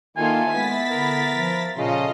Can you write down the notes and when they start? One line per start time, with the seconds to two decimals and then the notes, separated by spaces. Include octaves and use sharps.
0.17 D#3 A#3 E4 F4 A4 G#5
0.54 G#3 B3 E4 A6 B6
0.90 D3 A#4
1.31 F3
1.77 A#2 C#3 F4 A4 D#5